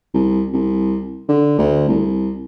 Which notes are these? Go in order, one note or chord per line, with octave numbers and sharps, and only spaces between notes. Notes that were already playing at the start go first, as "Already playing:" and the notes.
C2
C2
D3
D2
C2